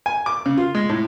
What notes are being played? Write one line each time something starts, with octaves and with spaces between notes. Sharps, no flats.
G#5
D6
C#3
F4
G#3
A2